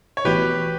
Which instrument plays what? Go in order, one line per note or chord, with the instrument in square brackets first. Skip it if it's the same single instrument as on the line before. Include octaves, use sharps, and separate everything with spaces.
[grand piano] C#5
[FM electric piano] B1 A2 E3 B3 F#4 [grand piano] G4 B4